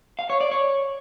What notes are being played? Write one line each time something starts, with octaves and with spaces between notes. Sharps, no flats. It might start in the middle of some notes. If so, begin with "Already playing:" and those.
F5
C#5
D5
C#5